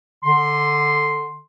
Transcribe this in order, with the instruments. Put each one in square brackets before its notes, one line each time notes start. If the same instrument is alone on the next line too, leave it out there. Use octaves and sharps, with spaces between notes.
[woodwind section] D3 C6